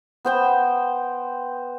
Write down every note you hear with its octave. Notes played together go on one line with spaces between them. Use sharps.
B3 C5 G5